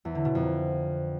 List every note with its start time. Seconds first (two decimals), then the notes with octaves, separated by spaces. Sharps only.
0.05 E2
0.15 D3
0.25 B2
0.35 F2